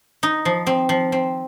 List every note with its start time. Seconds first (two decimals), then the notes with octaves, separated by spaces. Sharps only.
0.23 D#4
0.45 F3
0.67 C4
0.89 F3
1.12 C4